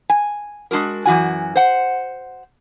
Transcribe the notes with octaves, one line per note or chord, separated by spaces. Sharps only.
G#5
G#3 D4 F#4 A#4
F#2 E3 F#4 G#5
C5 F#5